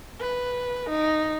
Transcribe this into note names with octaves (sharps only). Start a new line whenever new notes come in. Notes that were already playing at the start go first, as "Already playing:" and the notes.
B4
D#4